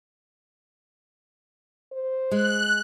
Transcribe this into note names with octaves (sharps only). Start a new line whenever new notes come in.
C5
G#3 F#6